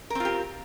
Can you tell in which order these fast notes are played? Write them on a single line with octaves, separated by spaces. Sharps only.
A#4 C4 F4 G4